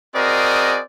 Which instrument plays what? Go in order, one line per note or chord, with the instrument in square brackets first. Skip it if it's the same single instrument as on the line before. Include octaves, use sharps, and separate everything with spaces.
[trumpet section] C4 F#4 G#4 A#4 D5 D#5